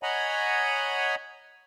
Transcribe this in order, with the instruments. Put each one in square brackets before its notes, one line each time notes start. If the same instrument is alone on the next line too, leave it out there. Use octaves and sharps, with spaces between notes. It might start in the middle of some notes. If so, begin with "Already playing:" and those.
[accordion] C#5 D#5 F#5 G#5 A#5 B5